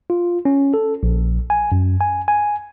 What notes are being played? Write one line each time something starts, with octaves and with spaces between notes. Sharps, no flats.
F4
C#4
A4
A#1
G#5
F#2
G#5
G#5